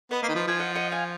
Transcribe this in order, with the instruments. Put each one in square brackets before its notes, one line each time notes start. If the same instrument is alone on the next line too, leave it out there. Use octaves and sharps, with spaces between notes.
[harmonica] B3 [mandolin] B4 D#5
[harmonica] A#3
D#3
F3
[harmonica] F3 [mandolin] G#5
[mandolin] D#5 F#5
D#5 F#5
F5 G#5